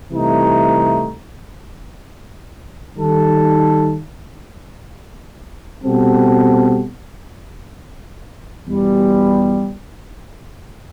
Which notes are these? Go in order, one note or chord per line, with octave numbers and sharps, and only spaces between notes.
C2 C3 E3 A3 D#4
D#3 G3 D#4 A4
B2 G3 C4 F#4 A4
E2 B2 G3